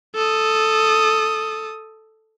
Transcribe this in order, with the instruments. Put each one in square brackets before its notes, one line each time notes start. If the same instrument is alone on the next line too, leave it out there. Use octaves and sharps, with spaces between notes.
[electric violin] A4 D#6